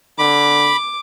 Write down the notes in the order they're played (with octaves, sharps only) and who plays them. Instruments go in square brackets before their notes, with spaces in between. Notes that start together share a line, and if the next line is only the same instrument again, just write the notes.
[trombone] D3 [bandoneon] B5 [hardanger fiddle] D6